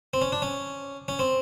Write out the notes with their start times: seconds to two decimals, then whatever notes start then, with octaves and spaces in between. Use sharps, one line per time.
0.14 C4
0.22 C#4
0.32 D4
0.42 C#4
1.08 C#4
1.19 C4